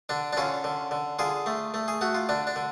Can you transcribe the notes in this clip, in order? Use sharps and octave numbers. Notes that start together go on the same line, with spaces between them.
D3 D4
D4
D3 C#4 F4
D3
D3
D3 F4 G#4
A3
A3
G#4
A3 F#4
F4
D3 D4
D4
D3